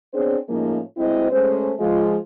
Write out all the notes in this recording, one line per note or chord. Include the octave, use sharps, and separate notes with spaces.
B3 C4 D4 G#4 C5 C#5
A2 F3 G#3 A#3 C#4 D#4
D2 G#3 C4 E4 C5 D#5
G#3 A3 C#4 C5
F3 G#3 F4